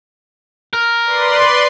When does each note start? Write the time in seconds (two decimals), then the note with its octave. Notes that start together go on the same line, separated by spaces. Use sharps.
0.73 A#4
1.05 B4 D5 C6